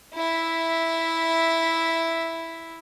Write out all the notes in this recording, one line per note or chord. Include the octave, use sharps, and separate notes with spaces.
E4 E5